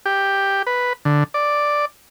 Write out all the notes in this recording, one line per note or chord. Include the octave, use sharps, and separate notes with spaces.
G4
B4
D3
D5